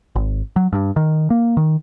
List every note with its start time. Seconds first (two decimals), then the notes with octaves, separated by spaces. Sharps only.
0.16 G#1
0.56 F#3
0.73 G2
0.96 D#3
1.30 A#3
1.57 D#3